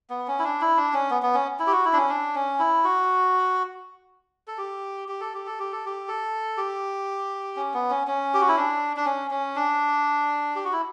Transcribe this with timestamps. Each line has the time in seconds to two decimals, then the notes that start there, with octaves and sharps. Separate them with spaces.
0.10 B3
0.28 C#4
0.39 E4
0.44 D4
0.61 E4
0.77 D4
0.93 C#4
1.11 B3
1.23 B3
1.34 C#4
1.59 E4
1.67 G4
1.72 F#4
1.85 E4
1.93 D4
1.98 C#4
2.09 D4
2.35 C#4
2.59 E4
2.84 F#4
4.48 A4
4.58 G4
5.08 G4
5.20 A4
5.34 G4
5.46 A4
5.59 G4
5.72 A4
5.86 G4
6.08 A4
6.57 G4
7.56 C#4
7.74 B3
7.90 C#4
8.07 C#4
8.34 G4
8.41 F#4
8.48 E4
8.57 D4
8.97 D4
9.06 C#4
9.31 C#4
9.56 D4
10.56 G4
10.65 F#4
10.73 E4